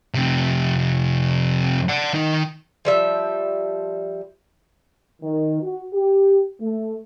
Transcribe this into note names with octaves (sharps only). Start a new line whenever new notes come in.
F2 C3
D5 F#5
D#3 D#4
F3 G3 E5
D#3
F#4
G4
A3